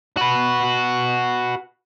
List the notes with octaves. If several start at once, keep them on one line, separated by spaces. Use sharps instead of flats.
F#4 B4